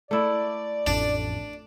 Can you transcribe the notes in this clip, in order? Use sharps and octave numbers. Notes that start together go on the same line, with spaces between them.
A3 E4 D5
A1 F2 D4